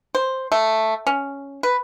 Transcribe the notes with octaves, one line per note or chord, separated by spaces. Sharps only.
C5
A3
C#4
B4